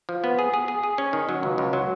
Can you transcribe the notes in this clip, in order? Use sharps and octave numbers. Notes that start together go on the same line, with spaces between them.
F3
B3
G#4
G#4
G#4
G#4
C#4
D#3
F#3
C#2
C#2
F#3